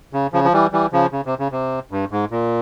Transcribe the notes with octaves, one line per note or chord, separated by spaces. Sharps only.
C#3
C#3 F3
F3
E3 G3
E3 G3
C#3 F3
C#3
C3
C#3
C3
G2
G#2
A#2